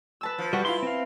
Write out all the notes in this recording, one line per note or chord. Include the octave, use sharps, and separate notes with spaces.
B4 A5 E6
F3
G3 F#4 B4
E4 F4 C6
C4 F5